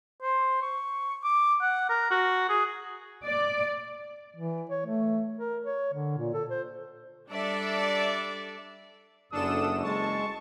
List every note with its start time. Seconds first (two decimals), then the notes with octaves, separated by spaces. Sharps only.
0.22 C5
0.62 C#6
1.24 D6
1.61 F#5
1.89 A#4
2.11 F#4
2.49 G#4
3.24 D5
4.36 E3
4.69 C#5
4.86 A3
5.37 A#4
5.66 C#5
5.93 D3
6.18 A#2
6.34 A4
6.49 C5
7.30 G3 D4 A4 D5 E5
9.32 F#1 F#2 D4 A4 D#6 E7
9.84 G#3 A5 C#6